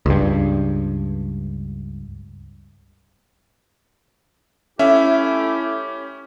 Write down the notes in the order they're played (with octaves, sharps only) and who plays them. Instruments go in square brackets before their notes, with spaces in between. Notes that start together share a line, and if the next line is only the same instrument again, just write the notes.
[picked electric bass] C#2 G2
[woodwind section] A3 E4 G4 [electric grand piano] C#4 [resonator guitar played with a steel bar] E5